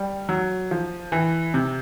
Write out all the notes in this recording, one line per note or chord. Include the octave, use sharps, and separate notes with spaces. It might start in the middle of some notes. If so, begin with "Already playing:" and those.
Already playing: G3
F#3
F3
E3
C3